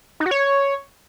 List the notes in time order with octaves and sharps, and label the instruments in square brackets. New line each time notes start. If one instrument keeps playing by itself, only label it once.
[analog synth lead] D#4
F#4
C#5